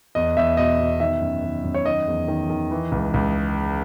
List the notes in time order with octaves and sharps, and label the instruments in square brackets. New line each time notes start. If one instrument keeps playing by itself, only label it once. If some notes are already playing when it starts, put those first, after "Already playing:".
[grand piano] E2 D#5
E2 E5
B2 D#5
B2
D#3 E5
F#2
D#3
F#2
C#5
D#3 D#5
E2
D#3
D#3
E3
C#2
C#2